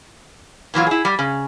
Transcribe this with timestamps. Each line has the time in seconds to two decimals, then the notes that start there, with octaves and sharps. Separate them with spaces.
0.74 A#2 E3 F#3 F4
0.87 E4 G#4
1.05 G3
1.19 C#3